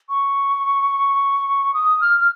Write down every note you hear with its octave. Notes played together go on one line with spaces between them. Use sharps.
C#6
D#6
F6
F6